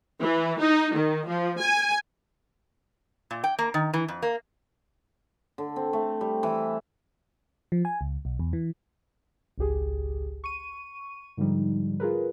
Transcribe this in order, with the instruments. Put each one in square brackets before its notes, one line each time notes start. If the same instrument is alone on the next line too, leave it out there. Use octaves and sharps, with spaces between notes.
[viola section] E3
D#4
D#3
F3
G#5
[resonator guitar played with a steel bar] A#2
G5
A#3
D#3
E3
F2
A#3
[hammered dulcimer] D3
C4
A3
G3
E3
[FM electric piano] F3
G#5
C#2
B1
E2
E3
[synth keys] G#1 C#2 G4 G#4
C#6 D#7
G#2 D3 F3 G3 D#4
F4 G#4 A#4 B4